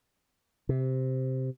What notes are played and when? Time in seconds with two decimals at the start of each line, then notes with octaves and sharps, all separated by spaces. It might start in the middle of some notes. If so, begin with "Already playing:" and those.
0.69 C3